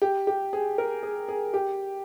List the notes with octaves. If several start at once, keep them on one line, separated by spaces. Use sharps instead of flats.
G4
G4
G#4
A#4
G#4
G#4
G4